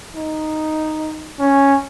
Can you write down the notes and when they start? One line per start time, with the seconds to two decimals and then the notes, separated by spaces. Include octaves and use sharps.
0.15 D#4
1.39 C#4